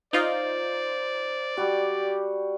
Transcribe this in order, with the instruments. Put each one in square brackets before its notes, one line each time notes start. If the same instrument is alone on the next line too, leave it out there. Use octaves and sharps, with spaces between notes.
[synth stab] D#4 F4 [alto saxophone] C5 [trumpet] D5
[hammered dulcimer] G3 F#4 [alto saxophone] G4